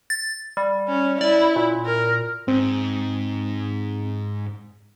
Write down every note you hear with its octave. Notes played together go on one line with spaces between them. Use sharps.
A6
G3
C#4
E4 D5
A#2
A#4
G#2 C4